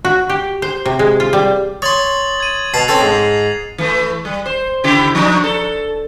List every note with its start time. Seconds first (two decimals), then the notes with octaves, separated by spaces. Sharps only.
0.05 F#4
0.30 G4
0.62 C5
0.85 C3
0.99 G#3
1.20 F4
1.33 G3
1.82 C#5 C6 D#6 A6 F#7
2.40 G#6 D#7
2.74 B2 A5 C7 F7
2.88 C4 C#4 A4
3.01 G#2
3.78 E3 A3
4.25 G3
4.46 C5
4.84 C#3 E4 G4
5.15 F3 D4 D#4
5.44 A4